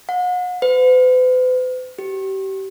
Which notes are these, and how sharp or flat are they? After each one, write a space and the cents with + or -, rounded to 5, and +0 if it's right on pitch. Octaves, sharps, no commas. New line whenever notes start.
F#5 -40
B4 +45
G4 -30